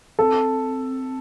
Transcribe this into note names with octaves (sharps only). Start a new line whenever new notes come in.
C4 A4